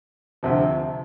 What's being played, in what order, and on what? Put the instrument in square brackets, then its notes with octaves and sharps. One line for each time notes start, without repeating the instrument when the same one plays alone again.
[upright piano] D2 C3 F3